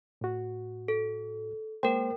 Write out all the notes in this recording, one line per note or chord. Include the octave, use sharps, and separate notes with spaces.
A2 F#4
A4
G#3 A#3 A#4 C5 G5